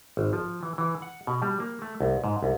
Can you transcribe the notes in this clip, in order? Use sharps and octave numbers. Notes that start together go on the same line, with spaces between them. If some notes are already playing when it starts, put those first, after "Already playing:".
G#1
F3
E3
E3
F#5
B2
G3
A#3
A3
C2
G#2
C2